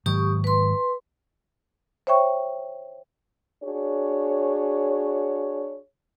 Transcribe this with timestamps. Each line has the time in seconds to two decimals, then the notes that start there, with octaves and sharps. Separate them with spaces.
0.06 G#2 D#3 F#3 G4 C#6 D#6
0.44 B4 C6
2.07 C5 C#5 E5 G5 C#6
3.63 D4 F#4 G#4 C#5